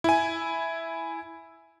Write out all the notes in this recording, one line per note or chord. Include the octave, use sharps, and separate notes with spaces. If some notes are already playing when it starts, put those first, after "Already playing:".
E4 G#5